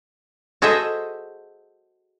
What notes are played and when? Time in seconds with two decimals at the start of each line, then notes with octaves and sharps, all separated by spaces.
0.62 F#4 G#4 A4 C5 D#5 E5